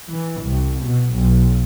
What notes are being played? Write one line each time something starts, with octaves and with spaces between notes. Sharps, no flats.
E3
C2
B2
B1